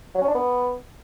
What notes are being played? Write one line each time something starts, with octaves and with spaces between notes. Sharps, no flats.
F#3
C#4
D4
B3